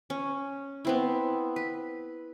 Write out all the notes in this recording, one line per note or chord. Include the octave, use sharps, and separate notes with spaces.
C#4
B3 C4 E4
B4